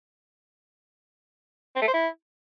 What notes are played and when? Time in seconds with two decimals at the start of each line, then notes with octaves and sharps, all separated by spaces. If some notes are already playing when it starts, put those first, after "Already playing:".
1.76 C4
1.82 A3
1.88 C5
1.93 E4